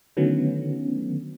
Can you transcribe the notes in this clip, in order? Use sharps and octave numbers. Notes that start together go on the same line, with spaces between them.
D3 D#3 F#3 A3 B3 C#4